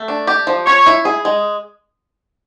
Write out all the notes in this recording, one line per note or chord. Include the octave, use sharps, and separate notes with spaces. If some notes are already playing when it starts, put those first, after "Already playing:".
Already playing: A3
D4
G4
F3
C#4 C#5
E4
G#4
G#3